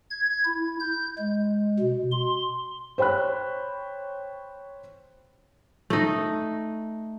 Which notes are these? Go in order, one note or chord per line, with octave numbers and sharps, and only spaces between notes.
G#6
E4
G6
G#3
B2
C6
C5 C#5 G5 B5 F#6
A3 D#4